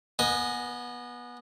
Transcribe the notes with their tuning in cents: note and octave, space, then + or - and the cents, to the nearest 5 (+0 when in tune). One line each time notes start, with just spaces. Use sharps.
B3 -20 D#5 +0 G#5 +0